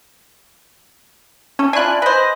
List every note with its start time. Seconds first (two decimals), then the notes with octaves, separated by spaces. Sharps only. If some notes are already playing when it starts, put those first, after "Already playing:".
1.59 C#4 A4
1.73 D4 E4 F4 D5 G#5 F#6
2.02 B4 C5 D#5